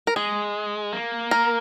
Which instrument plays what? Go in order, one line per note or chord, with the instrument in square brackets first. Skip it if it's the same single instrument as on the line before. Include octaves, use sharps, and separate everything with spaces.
[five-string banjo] A#4
[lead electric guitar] G#3 [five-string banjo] G#4
[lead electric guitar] A#3
[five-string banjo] A#4